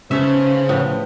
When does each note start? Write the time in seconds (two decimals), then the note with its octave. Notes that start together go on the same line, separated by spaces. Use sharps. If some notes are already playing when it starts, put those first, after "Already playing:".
0.11 C#3 B3 C#4 D#4 A4 C5 E5
0.69 A2 F3 B3 G4